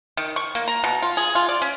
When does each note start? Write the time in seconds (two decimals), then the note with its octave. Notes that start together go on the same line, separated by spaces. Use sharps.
0.17 D#3
0.36 C#6
0.55 A#3
0.68 A#5
0.84 B2
1.02 F4
1.17 G#4
1.35 F4
1.49 D5
1.62 C#4